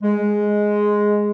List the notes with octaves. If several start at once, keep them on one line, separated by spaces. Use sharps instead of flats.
G#3